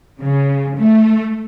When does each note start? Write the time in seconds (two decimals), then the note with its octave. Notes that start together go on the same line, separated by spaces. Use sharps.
0.20 C#3
0.77 A3